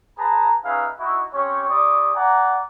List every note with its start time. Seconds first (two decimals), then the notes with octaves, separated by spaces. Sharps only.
0.19 G#4 B4 A5 A#5
0.65 C#4 D#4 G#4 B4 E5 F5
1.00 D#4 E4 F#4
1.34 C4 C#4 G4 C#5
1.69 E4 G4 D5 C#6 D#6
2.15 D5 F#5 G#5 A#5